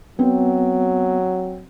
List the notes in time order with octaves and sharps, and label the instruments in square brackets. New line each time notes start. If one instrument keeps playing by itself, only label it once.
[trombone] F#3 [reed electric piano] B3 [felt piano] C4